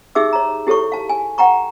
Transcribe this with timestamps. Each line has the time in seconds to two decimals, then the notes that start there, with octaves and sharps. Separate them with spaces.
0.15 D#4 G4 G#4 E5 D6 E6
0.33 C#5 A#5
0.67 E4 G4 A4 C#5 C#6
0.92 F5 A5
1.09 G#5
1.38 F#5 G5 A#5 C#6